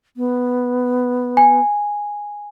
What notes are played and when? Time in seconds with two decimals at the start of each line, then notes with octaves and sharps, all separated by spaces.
0.17 B3
1.37 G#5